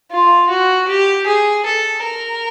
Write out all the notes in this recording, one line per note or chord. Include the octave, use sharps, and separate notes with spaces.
F4
F#4
G4
G#4
A4
A#4